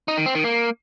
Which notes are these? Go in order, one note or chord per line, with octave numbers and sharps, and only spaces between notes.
D#4
D#3
C4
D#3
A#3